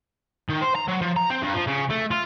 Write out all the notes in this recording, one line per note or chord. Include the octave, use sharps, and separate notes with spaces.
D#3
C5
A#5
F#3
F3
A#5
C4
G2
F3
C#3
A3
F4